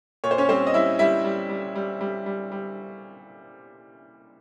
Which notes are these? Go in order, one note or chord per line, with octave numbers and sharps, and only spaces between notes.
A#2 C#5
C5
C#4 C#5
G3 C4 C5
D#5
G3 E4 E5
G3 E4 E5
G3
G3
G3
G3
G3
G3